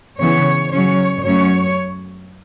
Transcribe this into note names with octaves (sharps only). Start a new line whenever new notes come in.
C#3 E3 B3 C#5
C#3 F#3 C#4 C#5
F#2 F#3 A3 C#4 C#5